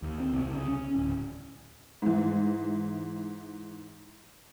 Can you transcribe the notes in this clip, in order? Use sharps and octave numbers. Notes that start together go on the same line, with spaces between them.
D#2
C4
C2
C#3
C#4
D1
G#2 E3